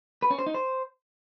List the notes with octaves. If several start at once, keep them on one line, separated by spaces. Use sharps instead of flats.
B4
C#4
C5
D#4
C5